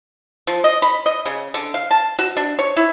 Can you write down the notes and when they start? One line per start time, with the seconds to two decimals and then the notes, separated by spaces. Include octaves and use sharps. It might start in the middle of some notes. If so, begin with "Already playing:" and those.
0.47 F3
0.64 D#5
0.82 B5
1.06 D#5
1.26 C#3
1.54 D3
1.74 F5
1.91 A5
2.19 F#4
2.37 D4
2.59 C#5
2.76 E4